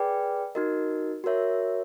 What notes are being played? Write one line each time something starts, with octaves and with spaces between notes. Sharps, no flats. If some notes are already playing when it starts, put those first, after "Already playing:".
Already playing: G#4 B4 D5 G5
D#4 F#4 A#4 D#5
F#4 A#4 C#5 E5